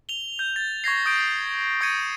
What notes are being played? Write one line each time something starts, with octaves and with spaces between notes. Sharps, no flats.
F7 G7
G6
A6
C#6 G#6 A#6 C7
D#6 G6 D7
C#6 D#6 G#6 C#7 D#7